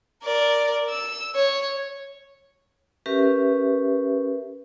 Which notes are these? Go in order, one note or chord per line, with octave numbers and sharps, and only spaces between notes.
A#4 D5
E6
C#5
C#4 G4 A#4 B4 E5